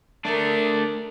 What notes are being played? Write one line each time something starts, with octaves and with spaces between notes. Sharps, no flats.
A3 D4 A#4